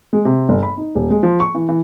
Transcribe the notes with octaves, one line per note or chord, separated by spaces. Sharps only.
G#3
C3
G1
B5
D#4
D#1
G#3
F3
C#6
E3
E3